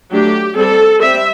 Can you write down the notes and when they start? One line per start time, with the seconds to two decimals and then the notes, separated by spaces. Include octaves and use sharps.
0.11 F#3 A3 D4 G4
0.55 G3 C4 A4
0.99 G3 C4 E5